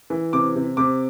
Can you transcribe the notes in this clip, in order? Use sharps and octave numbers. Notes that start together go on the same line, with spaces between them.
E3
C3 D6
C3
C3 D6